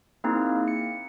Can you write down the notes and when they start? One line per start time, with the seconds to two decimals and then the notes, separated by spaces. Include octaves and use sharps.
0.24 A#3 C4 D#4 E4 G#4
0.68 C#7